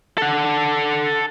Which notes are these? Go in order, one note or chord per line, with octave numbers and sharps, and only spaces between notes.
A4 F#5